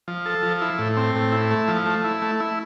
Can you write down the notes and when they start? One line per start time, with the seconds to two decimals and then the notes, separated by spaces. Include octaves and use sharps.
0.08 F3
0.26 A4
0.43 F3
0.61 E4
0.79 A2
0.97 C4
1.15 A2
1.32 E4
1.51 A3
1.68 F3
1.86 A3
2.04 E4
2.22 A3
2.40 E4